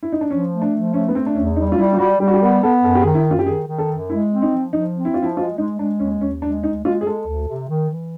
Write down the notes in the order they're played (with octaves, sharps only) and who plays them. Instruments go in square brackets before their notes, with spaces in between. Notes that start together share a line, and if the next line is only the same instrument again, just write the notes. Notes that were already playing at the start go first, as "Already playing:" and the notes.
[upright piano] E4
D#4
D4
[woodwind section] F3 [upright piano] C#4
[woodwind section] A3
[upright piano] D4
[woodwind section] F3
[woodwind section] A3 [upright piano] C#4
[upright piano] B3
[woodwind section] A3 [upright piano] C4
[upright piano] D4
[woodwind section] E2 [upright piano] C#4
[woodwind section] G3 [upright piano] D#4
[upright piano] F4
[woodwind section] G3 [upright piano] E4
[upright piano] F4
[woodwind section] G3 [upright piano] F#4
[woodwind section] G3 [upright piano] G4
[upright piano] F#4
G4
[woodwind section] B3 [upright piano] A#4
[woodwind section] B3 [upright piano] A4
[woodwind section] F#2 [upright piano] A4
[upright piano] G4
G#4
[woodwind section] D#3
[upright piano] E4
[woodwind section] F#2 [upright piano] F4
[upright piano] G4
[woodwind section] D#3 [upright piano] G#4
[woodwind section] D#3
[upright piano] A4
[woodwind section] F#2
[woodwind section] G#3 [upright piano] E4
[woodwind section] C4
[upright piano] D#4
[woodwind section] F3
[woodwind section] F3 [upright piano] D#4
[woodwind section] C4
[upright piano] E4
[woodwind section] F3 [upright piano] F4
[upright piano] E4
[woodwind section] G#3 [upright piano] F4
[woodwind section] G#3 [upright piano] D#4
[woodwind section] G#3 [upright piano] D4
[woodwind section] D#2 [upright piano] C#4
[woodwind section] D#2 [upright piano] C#4
[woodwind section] G#3 [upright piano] D4
[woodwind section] D2 [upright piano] D#4
[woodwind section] G#3 [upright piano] F4
[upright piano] G#4
[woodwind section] G#3 [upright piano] A4
[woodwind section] D2
C3
D#3
E3